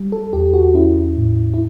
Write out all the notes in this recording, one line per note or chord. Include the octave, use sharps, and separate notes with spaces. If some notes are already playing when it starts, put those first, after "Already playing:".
Already playing: G3
A4
E2 G4
F#4
C#4 E4
A2
E4